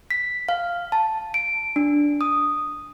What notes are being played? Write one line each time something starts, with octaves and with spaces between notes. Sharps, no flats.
B6
F5
A5
D7
D4
D#6